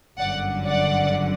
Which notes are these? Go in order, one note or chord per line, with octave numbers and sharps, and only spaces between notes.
G1 F#2 D3 D5 F#5
D5 F#5